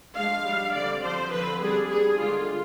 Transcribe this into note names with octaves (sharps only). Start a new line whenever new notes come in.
F3 G#3 D4 F5
G3 D4
D3 G3 C4 D5
F3 C4 C5
D3 F3 C4 B4
G3 D4 G#4
G3 B3 D4 G#4
D3 G#3 D4 F4